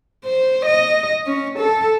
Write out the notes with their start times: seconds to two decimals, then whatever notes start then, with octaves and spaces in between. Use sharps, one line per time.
0.25 C5
0.66 D#5
1.26 C#4
1.59 A4